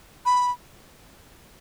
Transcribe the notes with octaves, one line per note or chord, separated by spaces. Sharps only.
B5